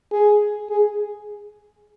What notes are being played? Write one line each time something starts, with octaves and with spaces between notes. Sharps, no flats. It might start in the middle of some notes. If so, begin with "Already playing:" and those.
G#4
G#4